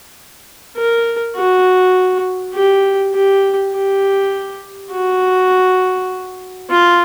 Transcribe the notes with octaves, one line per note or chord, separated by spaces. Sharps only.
A#4
F#4
G4
G4
G4
F#4
F4